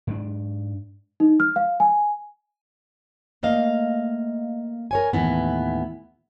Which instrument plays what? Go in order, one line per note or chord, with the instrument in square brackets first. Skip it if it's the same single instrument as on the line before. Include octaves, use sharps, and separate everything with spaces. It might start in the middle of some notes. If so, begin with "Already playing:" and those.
[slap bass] G#2 D4
[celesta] D#4
F6
F5
G#5
[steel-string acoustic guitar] A3 A#3 D#5 F5
A#4 C#5 G#5
D#2 A2 E3 B3